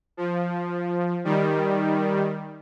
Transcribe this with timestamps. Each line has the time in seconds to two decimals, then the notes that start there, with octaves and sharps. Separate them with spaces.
0.17 F3
1.24 D#3 G3